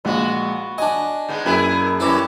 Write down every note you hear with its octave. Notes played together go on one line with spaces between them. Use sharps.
A#1 G#3 B3 F#4
D4 D#5 G#5
G#2 G#3 B3
F#2 A#3 E4 G#4 B4
G3 C#4 E4 A4 B4 D6